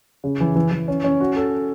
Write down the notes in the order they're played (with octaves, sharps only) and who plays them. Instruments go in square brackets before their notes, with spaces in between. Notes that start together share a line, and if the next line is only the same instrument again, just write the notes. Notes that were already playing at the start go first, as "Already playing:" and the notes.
[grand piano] C#3
E3
E3
E3
C#4
C#4
F#4
A4